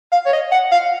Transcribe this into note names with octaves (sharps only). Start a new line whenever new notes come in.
F5
C#5
D#5
F#5
F5